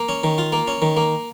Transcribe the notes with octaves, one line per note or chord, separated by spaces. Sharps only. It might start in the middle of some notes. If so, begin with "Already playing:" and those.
Already playing: A#3
C#4
D#3
F4
A#3
C#4
D#3
A#3